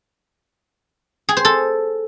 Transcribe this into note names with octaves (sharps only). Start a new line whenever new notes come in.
G#4
C5
A4